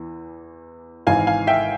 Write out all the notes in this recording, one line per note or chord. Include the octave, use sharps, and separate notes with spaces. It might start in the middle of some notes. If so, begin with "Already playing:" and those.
Already playing: E2 E3
G#1 G#2 E3 F5 G#5
F5 G#5
E5 G5